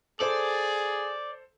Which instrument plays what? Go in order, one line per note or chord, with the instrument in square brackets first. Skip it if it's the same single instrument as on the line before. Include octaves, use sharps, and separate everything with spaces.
[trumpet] G#4 [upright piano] A4 C5 [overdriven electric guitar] D5